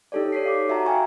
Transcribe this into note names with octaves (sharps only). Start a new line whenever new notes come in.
D#4 G4 A4 C#5 D5
C#5 B6 C7
F5 D6
F#4 E5 F#5 A5 A#5
F5 G5 G#5 C#6